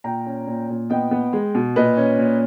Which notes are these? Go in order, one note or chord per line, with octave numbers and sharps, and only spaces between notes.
A#2 G5 A#5
C#4
A#2
A#2
B3 D#5 G5
B3
G#3
B2
A#2 B4 D#5
C#4
A#2